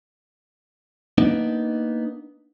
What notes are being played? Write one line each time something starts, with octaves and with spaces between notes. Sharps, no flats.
A#3 B3 D4 D#4